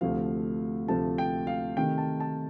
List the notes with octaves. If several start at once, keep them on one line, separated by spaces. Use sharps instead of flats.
D2 C3 F3 A3 F5
D2 C3 F3 A3 A5
G5
F5
C3 D#3 A3 G5
A5
A5